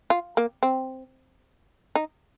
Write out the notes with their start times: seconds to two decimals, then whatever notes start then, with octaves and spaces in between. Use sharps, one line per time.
0.10 F4
0.37 A#3
0.63 C4
1.95 D#4